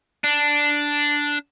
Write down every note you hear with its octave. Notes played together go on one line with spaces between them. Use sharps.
D4